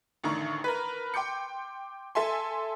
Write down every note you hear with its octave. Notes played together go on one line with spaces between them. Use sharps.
A1 D3 D#3 A#5 C#6
A#4 B4
G5 C6 D6 G6 C#7
A4 E5 G#5 C6